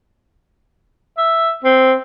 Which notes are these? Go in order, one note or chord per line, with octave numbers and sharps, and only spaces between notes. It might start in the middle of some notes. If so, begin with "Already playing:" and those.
E5
C4